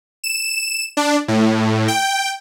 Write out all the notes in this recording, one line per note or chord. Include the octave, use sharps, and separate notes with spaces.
E7
D4
A2
G5